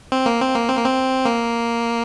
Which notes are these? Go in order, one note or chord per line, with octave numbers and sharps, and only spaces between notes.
C4
A#3
C4
A#3
C4
A#3
C4
A#3